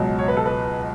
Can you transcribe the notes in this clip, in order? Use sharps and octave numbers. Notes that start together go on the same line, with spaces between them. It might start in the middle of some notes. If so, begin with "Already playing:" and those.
Already playing: C#2 B2 F#3
C#5
B4
A4
B4